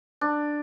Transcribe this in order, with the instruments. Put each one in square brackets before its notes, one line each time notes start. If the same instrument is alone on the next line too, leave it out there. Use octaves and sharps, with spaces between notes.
[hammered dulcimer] D4